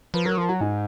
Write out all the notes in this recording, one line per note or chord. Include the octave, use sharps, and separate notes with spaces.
F3 B4
F#3 A#4
F3 A#4
F#3 F#4
G#2 D#4